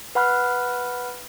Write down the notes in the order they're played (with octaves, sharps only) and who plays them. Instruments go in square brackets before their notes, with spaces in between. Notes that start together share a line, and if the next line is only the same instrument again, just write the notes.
[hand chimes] B4 F#5 B5 F6 F#6